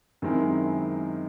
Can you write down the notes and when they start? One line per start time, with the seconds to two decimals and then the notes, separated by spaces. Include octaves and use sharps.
0.22 F#2 D#3 G#3 C4 E4